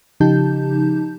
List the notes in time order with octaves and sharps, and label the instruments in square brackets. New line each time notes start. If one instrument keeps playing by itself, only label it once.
[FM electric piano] C#3 F3 D#4 G4 A5 G6